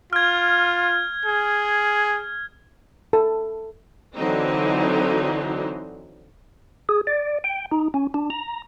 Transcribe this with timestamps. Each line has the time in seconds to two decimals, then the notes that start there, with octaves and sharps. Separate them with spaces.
0.13 F4 F6 G#6
1.25 G#4
3.13 A4
4.16 D3 E3 F#3 C4 D#4
6.89 G#4
7.07 D5
7.44 G5
7.72 D#4
7.94 C#4
8.14 D4
8.30 A#5